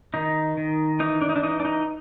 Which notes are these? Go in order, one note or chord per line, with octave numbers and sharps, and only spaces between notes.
D#3 D#4
D#3
E3 D#4
D4
D#4
D4
E3 D#4
D4
D#4